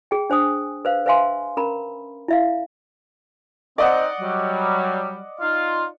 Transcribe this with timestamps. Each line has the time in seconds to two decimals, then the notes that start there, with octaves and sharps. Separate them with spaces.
0.11 G#4 G5
0.30 D4 C5 G#5 D#6
0.85 B4 C5 F5
1.06 B4 C5 E5 F5 G#5 C6
1.57 C#4 A#4 A#5 B5
2.28 E4 E5 F5
3.78 C4 D#4 D5 D#5 F#5
4.20 F#3 G3
5.40 D#4 F4 F5